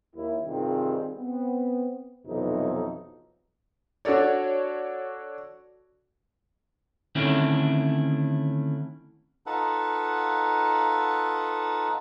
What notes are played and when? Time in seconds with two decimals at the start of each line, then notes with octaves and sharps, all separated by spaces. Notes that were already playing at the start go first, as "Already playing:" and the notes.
0.15 D#2 E4
0.46 G2 C3 D#3 C4 F4 G#4
1.17 B3 C4
2.27 B1 F2 C3 E3 D#4 A4
4.05 D4 F#4 A4 C#5 D5
7.15 D3 D#3 A3 C4 C#4 E4
9.46 D#4 F4 A4 B4 F#5